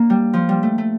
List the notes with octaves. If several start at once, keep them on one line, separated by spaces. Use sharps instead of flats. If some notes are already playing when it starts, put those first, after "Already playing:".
Already playing: A#3 D4
G3
F3
G3
A3
A3